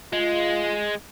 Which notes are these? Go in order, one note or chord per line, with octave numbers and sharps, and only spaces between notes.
G#3 F4